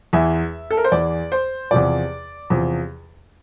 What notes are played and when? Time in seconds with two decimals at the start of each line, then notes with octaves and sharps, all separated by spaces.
0.13 E2 E3 E5
0.71 A4
0.77 A#4
0.84 C5
0.92 E2 E3 D5
1.32 C5
1.71 E2 C3 F3 D5
2.50 E2 C3 F3